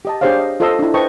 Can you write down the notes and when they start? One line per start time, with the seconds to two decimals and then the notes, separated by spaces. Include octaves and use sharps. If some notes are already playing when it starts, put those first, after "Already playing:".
0.05 G4 D#5 A5
0.21 D4 G4 G#4 C5 C#5 F5
0.39 D#5
0.60 F4 A4 C5 D#5 C6 E6
0.79 D4 E4
0.94 B4 C5 D#5 G5 A5 C#6